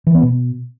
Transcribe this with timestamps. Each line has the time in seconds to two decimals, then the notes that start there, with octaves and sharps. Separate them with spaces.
0.07 E3
0.15 B3
0.23 B2